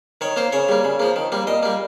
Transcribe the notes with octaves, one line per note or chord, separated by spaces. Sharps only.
D#3 C#5
A#3 C5
C#3 C#5
G3 A#3
C#3
F3 A#3
D#3
G3 A#3
A#2 D#5
G3 A#3